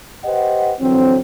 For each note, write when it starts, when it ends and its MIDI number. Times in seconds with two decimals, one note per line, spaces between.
0.25 0.73 67
0.25 0.73 71
0.25 0.73 72
0.25 0.73 75
0.25 0.73 78
0.80 1.18 41
0.80 1.18 50
0.80 1.18 52
0.80 1.18 54
0.80 1.18 60